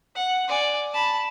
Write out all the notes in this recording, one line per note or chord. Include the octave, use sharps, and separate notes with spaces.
F#5
D5 G#5
A5 B5